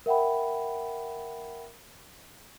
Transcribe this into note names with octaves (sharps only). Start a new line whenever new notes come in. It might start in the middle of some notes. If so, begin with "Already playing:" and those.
A#4 E5 F#5 G5 B5